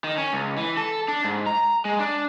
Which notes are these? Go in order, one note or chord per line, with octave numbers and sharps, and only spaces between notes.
D#3
C#4
C#2
E3
A4
D4
G#2
A#5
G#3
D4